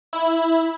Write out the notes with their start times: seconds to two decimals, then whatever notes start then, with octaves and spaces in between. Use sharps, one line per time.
0.13 E4